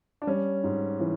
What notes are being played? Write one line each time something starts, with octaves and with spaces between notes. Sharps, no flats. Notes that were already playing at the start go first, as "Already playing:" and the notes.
D4
G3 C#4
G#2
E3 C#4